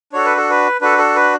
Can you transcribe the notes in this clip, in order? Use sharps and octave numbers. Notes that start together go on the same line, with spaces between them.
D4 F#4 A4 C#5
B4
A4
B4
D4 F#4 A4 B4
A4
B4